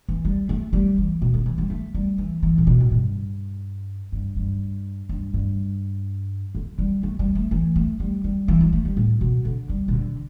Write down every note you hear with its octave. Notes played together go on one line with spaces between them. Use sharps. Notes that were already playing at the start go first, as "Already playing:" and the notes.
E3
G3
A3
G3
E3
B2
D3
E3
G3
A3
G3
E3
E3
A2
B2
A2
G2
G2
G2
G2
G2
D3
G3
A3
G3
A3
E3
A3
G3
G3
E3
G3
A3
G3
A2
B2
D3
G3
B2
D3